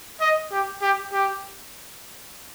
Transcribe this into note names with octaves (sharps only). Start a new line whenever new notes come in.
D#5
G4
G4
G4